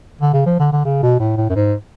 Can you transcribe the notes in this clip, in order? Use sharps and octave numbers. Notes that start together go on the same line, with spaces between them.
D3
C#3
F3
D3
D3
C#3
B2
A2
A2
F#2
G#2